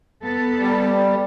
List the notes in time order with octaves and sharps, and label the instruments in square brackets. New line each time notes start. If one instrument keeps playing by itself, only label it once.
[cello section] B3 A4
[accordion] G3